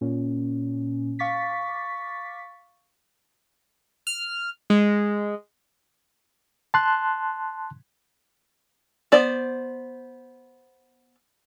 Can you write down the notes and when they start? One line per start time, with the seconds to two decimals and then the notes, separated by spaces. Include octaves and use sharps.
0.01 A#2 C#4
1.19 F5 C#6 D6 A6 B6
4.07 F6
4.70 G#3
6.74 A5 C6 F#6
9.12 B3 C5 D5